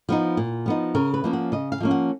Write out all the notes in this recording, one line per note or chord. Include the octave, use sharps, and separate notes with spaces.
F3 B3 D#4
A#2
F3 B3 D#4
C#3 A#4
B4
F3 A#3 C#4
F#5
C#3 D#5
F5
F3 A#3 C#4
F#5